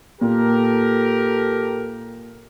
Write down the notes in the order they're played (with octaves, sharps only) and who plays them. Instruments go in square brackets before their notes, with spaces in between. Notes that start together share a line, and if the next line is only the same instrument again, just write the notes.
[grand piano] A#2 [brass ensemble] G4 A4 A#4